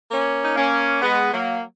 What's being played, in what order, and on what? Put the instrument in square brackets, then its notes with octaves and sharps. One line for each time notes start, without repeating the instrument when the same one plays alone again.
[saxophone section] A#3 C#4
D#4
A#3 C#4
G#3 B3
F#3 A#3